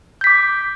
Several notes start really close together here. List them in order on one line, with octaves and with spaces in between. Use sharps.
G6 B6 D6